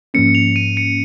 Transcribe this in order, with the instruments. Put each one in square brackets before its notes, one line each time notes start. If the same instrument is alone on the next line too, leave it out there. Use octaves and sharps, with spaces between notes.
[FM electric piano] G#2 F3 A#3 C#4 [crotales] C#7
[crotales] F7
D#7
C#7